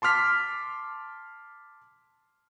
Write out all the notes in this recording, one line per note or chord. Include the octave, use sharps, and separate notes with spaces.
A5 C6 D6 F6 B6